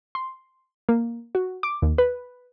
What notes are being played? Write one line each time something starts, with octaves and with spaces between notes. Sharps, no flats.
C6
A#3
F#4
D6
D#2
B4